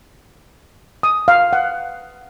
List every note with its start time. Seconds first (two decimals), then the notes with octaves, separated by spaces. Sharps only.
1.03 D#6
1.28 F5
1.53 F#5